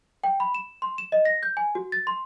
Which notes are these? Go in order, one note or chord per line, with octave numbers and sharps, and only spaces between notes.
G5
B5
E7
C6
E7
D#5
A#6
G6
G#5
F#4
A6
C6